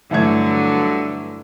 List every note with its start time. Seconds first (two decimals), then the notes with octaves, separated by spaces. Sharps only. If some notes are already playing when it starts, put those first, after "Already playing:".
0.11 G2 D3 E3 F#3 A3 G#6